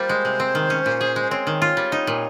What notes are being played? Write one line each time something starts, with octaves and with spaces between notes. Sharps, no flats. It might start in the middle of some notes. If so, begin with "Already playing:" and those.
Already playing: G3 A#3 F4 C5
G#3
C3
C4
D#3
C#4
A#2
G#4
G#3
C4 C#5
D#3
F4
G3
D#4
A#2